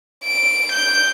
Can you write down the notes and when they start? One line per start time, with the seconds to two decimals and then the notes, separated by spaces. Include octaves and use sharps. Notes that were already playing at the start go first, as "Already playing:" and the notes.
0.24 D7
0.71 G6